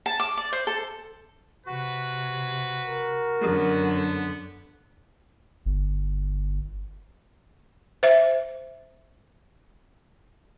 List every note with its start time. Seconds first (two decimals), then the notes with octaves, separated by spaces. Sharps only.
0.06 A5
0.20 D6
0.37 D5
0.53 C5
0.67 A4
1.66 C3 F#4 B4
2.86 A#4
3.40 F#2 D3 B3
5.65 G1
8.03 C5 E5